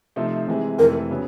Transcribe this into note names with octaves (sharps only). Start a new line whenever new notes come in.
C3 F3 A3 C4 D#4
C3 E3 G#3
F2 C3 E3 A3 A#4
C#3 F#3 B3